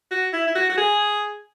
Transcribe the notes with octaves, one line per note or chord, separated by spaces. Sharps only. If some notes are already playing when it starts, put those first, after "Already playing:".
F#4
E4
E4
F#4
F#4
G#4